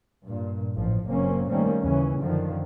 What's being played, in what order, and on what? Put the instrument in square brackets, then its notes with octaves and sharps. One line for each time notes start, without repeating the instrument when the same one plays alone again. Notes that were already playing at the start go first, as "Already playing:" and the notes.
[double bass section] G2 A#2
A1 A2 F3
F#1 F#2 A#3 C4 C#4
D#3 G3 A3 A#3 C4 C#4
D#2 C#3 E3 C#4
F#2 D3 D#3 F3